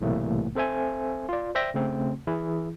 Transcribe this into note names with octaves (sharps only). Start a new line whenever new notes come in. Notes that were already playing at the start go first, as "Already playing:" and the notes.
B1 A2 C3 E3 A3 A#3
C4 A4 C5 E5 G#5
F4 D5
C5 D5 E5 G5 A#6
C#3 A3 C4
E3 E4 G#4